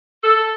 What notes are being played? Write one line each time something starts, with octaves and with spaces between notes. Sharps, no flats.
A4